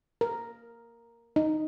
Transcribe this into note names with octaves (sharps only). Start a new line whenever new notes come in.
A#4
D#4